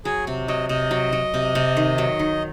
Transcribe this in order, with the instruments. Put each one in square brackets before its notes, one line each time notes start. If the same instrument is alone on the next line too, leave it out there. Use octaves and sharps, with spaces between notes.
[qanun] F#3 [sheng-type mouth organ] G#4
[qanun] C3
[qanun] F#3 [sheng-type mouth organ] D#5
[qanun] C3 [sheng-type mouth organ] D#5
[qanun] F#3
F#3
C3
C3
D#3
F#3
D#3